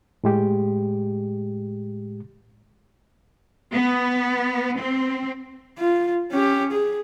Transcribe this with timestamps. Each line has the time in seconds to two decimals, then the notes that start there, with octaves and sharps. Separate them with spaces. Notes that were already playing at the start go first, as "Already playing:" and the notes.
0.24 A2 G#3 G4
3.73 B3
4.76 C4
5.78 F4
6.31 C#4 G4
6.72 G#4